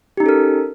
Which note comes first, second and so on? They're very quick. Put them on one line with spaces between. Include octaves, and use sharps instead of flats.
G4 D#4 C#4 A4 A#4